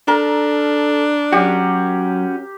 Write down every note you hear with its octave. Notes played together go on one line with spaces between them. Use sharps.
D4 A4 A#4
F#3 C#4 F#4 G4